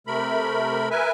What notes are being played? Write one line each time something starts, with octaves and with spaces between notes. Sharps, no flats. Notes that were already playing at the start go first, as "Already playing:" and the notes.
C3 A3 A#4 B5
A#4 B4 E5 G#5